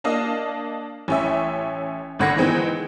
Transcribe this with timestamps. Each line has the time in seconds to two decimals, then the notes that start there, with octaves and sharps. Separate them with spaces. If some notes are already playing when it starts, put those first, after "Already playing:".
0.04 A#3 D4 D#5 F5
1.08 A1 C#4 E5
2.19 G#1 D3 F#5 G#6 A#6 C#7
2.36 D#3 E3 G#3 B3 C4 D#4